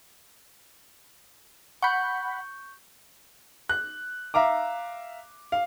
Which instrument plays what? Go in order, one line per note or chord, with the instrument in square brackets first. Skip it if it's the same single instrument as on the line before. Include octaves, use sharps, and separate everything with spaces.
[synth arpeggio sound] F#5 B5 [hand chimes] C#6 G6
[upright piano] F#6
E5 F5 A#5 D6
F5